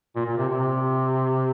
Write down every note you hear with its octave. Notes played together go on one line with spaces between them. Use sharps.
A#2
A#2
C3
C3